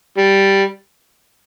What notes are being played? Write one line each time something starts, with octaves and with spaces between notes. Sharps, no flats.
G3